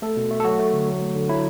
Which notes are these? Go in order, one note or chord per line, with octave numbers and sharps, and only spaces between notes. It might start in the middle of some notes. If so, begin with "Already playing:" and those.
A3 A4
B2
A3
A4
F#3 F#4
A3
D3
F#3
A3
D3
F#3 E4